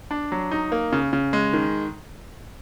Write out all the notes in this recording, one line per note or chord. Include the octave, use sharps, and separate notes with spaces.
D4
F#3
D#4
A#3
C#3
C#3
G#3
D#3